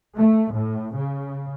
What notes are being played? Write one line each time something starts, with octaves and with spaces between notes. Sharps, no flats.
A3
A2
C#3